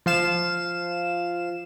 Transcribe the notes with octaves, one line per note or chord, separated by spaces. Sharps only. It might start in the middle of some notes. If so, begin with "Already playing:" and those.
F3 F5 E7